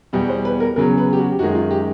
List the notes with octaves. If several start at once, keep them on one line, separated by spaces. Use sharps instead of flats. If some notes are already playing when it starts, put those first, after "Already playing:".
E2 B2 G3
C5
B4
A#4
E2 C#3 F#3 A#4
B4
G4
F#4
G4
F#2 D#3 G#3 F#4
F4
G4